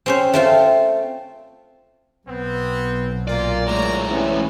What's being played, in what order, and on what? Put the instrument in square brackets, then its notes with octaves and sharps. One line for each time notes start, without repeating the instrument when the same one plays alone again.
[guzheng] C4 C#4 C5
A3 C4 F4
[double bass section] B1 [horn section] B3 C4
[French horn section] A#2 [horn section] A#3 F4 [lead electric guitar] D5
[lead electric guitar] A2 G#3 [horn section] C#5 D5 A#5
[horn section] C3 B3 [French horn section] E3 C#4